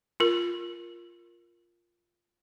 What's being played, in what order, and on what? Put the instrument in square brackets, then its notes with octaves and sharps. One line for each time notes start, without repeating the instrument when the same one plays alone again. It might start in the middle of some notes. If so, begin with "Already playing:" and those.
[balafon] F4 A#4